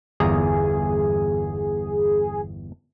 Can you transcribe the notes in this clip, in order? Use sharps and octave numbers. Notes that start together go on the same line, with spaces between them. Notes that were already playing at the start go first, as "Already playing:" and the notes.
G1 E2 G#4 A#5